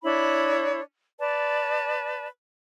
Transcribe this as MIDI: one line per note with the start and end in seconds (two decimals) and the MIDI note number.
0.03 0.80 62
0.03 0.80 64
0.03 0.80 73
0.03 0.80 83
1.20 2.27 71
1.20 2.27 74
1.20 2.27 81